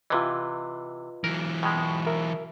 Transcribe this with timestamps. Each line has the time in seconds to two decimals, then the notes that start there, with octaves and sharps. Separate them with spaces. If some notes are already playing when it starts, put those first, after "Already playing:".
0.10 C3 E3 F4 B4 D#5
1.24 E3 F#3 A#4
1.63 B2 G#3 G5 B5
2.06 A#4 E5